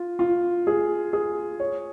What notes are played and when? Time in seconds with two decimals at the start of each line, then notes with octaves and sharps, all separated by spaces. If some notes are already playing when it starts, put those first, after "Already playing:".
Already playing: F4
0.19 F4
0.67 G#4
1.13 G#4
1.60 C#5